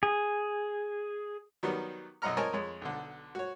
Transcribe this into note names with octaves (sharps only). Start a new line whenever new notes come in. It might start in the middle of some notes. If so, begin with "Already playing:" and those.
G#4
D#3 F#3 G3 B3
B1 F#2 D#5 F#5 A#5 F6
C4 A#4 C#5 D#5 G#5 A5
F2 G#3 C#5
B1 D3
F#4 C#5